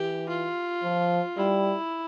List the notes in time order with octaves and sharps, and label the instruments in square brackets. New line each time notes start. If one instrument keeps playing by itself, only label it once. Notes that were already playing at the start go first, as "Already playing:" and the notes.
Already playing: [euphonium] E3 [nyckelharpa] G4
[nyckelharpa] F4
[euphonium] F3
[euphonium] G3 [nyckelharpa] E4